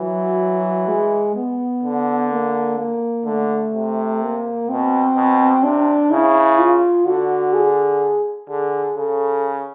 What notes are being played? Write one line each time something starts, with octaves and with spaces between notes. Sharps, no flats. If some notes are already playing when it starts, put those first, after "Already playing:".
Already playing: E3 F#3
G#3
B3
D3
A#3
A#3
D3 A3
C3
A#3
B2 C4
B2
C3 D4
C#3 E4
F4
D3 F#4
G#4
D3 G#4
C#3 A4